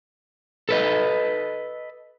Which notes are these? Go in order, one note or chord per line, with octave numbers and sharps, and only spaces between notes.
A4 B4 D#5